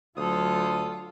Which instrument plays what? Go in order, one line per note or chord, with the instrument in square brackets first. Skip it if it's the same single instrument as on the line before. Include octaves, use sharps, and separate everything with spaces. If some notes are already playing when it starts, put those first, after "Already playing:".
[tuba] D2 [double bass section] F#3 [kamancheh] F4 A4 [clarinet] D#6